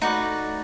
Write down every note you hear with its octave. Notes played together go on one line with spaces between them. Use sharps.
A3 D#4 F#4 B4 D5